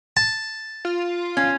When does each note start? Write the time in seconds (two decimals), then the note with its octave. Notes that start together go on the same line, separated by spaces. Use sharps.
0.17 A5
0.85 F4
1.37 C#4